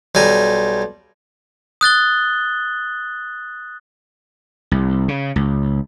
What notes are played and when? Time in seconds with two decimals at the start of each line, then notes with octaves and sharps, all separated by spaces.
0.15 B1 G3 G#5 A#5
1.81 D#6 F#6 A6 G7
4.71 C2
5.08 C#3
5.36 C#2